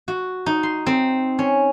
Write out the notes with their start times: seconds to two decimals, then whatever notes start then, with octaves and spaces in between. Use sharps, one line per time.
0.08 F#4
0.46 D#4
0.63 C6
0.86 C4
1.39 C#4